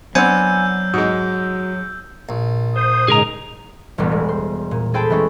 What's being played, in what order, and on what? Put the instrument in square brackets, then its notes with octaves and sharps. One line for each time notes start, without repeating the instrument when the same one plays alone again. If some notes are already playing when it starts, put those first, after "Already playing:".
[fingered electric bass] F#3 [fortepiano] B3 C4 D4 [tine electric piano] F#5 G#5 [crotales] E6 G6
[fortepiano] G#2 G#3 [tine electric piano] F#4
[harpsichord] A#1
[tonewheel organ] C5 [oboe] D#6
[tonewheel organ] G#2 C#3 G#3 [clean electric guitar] G#4 A#4 A#5
[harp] E1 A1 G3 B3
G#3
C5
A#2
G#4 A4 C5 G5 A5 B5
E3 G#3 A3 C#4